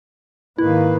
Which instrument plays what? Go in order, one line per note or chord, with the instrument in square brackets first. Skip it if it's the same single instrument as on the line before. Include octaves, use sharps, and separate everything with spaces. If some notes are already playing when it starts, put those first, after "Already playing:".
[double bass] G#2 D#3 [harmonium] A#3 B4 [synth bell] E4